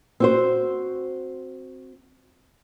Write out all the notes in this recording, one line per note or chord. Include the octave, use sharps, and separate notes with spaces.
C4 F#4 C5